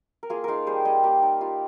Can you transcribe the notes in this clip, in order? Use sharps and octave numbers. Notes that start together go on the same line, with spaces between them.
A#4
A#3 F4 G#4
D#4 F4 G#4 A#4
G3 G#4 C5
G3 C5 D#5
A#3 G4
D#4
G3 F4